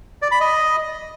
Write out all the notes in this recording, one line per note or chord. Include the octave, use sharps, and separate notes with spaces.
D5
B5
D#5